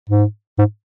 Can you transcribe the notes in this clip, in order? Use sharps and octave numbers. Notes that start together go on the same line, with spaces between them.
G#2
G#2